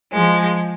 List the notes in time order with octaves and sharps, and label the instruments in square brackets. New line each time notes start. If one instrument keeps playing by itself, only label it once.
[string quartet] F3 G#3